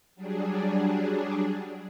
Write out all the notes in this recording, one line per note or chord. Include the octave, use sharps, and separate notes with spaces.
F#3 G3 D4 G#4